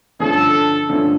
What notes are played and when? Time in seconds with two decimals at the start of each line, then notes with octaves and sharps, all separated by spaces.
0.19 G2 D3 F3 A3 C#4 A4
0.89 G2 D3 F3 A3 C#4